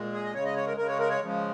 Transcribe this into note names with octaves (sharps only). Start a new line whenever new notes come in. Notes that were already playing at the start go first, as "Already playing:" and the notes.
Already playing: A#2 G#3
G#4
D#5
C#3 G#3 C#5
D#5
C#5
A#4
C#3 G#3 A#4
C#5
A#4
C#5
C#3 F3 G#3